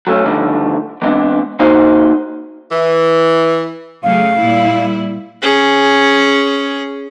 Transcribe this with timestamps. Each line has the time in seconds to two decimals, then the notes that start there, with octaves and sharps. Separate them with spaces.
0.07 F#3 A3 B3 C#4
0.25 G2 D3 D#3 F3 G3 A3
1.02 E3 G#3 A3 B3 C4 D4
1.59 C3 A#3 D#4 F#4 C5
2.72 E3
4.03 C#3 F#3 A3 F5
4.37 A#2 G3 E4
5.42 C#4 G#4